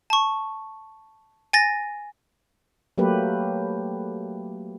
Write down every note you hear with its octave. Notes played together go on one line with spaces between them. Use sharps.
A5 C#6
G#5 A6 A#6
F#3 A3 A#3 G4 B4